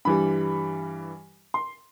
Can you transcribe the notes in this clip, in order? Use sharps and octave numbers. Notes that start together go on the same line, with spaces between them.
G2 E3 G3 B5
C6